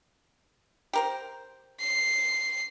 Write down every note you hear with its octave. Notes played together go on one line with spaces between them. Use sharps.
G4 A#4 C5
C7